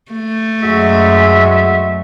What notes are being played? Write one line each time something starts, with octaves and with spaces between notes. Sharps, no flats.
A3
F#2 F#3 G#3 F#4 E5